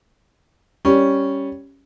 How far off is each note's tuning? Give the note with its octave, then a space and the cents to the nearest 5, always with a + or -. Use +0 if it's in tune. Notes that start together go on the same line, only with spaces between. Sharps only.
G3 +0 C#4 +0